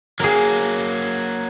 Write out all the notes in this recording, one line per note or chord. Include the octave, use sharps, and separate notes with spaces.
F#3 A#3 G#4 A#4